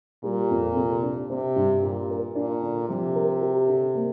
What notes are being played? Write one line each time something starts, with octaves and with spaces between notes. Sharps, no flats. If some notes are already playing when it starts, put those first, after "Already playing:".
A#2 G3
F2
C3
D4
C3 C4
G2
A#2 G3
A#4
A#2 D4
D3
C3 F3
A#4
G4
D3
A#3